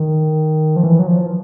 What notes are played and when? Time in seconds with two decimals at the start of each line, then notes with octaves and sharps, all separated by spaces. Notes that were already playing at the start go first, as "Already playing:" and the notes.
Already playing: D#3
0.76 F3
0.83 E3
0.99 F#3
1.07 F3